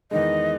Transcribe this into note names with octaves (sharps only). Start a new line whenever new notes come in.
E2 D#3 G#3 D#5